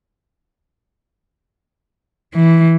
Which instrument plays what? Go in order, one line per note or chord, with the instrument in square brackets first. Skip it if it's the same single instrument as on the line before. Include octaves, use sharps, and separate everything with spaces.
[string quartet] E3